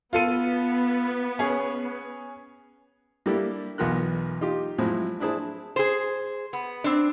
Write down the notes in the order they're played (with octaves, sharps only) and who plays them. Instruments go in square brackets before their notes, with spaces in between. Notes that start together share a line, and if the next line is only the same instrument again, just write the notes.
[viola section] B3 [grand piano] F4 A4 D#7
[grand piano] C#4 G#4
[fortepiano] G3 A#3 D4 E4 G4 A4
B1 E2 B3 F4 A#4 F#6
D#4 F4 G4
A2 F3 F#3 G#3 C4 E4
D4 E4 G#4 C5 A5
[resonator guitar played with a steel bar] G#4 C5
B3
C4 D4